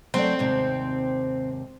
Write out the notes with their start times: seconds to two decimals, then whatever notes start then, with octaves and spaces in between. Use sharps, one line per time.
0.14 F#3 A3 C4 D5
0.39 D#2 G#2 C3